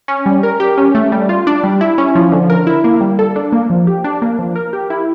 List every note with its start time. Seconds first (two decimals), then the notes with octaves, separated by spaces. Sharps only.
0.08 C#4
0.26 G3
0.43 A#4
0.60 G4
0.78 C#4
0.95 A3
1.12 G3
1.29 F4
1.47 D4
1.64 G3
1.81 E4
1.98 C#4
2.15 F3
2.32 D3
2.50 A#4
2.67 E4
2.84 A#3
3.01 G3
3.19 A4
3.36 D4
3.52 A#3
3.70 F3
3.87 G4
4.04 D4
4.22 A#3
4.39 F3
4.55 A#4
4.73 G4
4.90 E4